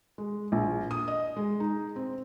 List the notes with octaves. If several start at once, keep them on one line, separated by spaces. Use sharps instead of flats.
G#3
A#1
D#6
D#5
G#3
D#4
C4